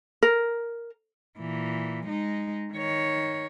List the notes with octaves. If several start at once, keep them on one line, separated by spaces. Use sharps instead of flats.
A#4
A#2 E3
G#3 D#4
D#3 C#5